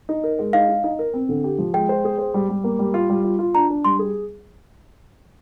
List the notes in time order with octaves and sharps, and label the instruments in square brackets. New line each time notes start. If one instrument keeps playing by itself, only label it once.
[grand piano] D#4
A#4
G#3
[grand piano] D#4 [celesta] F5
[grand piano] D#4
D#4
A#4
C4
D3
G4
F3
[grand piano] G#3 [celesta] G5
[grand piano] C5
G#4
C5
G3
G3
A#3
G3
F4
G3
F4
F4
[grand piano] D4 [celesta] A#5
[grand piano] D4
[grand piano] G3 [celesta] C6
[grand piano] G#4